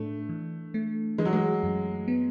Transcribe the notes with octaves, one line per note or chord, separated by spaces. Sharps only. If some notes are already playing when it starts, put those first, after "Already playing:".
Already playing: A2 A3 D4
E3
A3
E3 G#3
F#3
G#3
F#2
B3